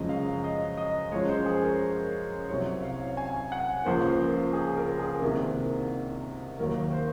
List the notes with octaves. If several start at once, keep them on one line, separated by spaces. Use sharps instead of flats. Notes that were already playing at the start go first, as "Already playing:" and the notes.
Already playing: F#2 C#3 F3 G#3 D#5
F5
D#5
D#5
F#2 F3 G#3 C#5
C5
G#4
A#4
C2 C3 F#3 C#5
F5
G#5
F#5
C#2 C#3 F3 A#3 C5
A#4
G#4
A#4
G#4
C2 C3 D#3 A#3
D#2 D#3 F#3 A#3 A#4
C5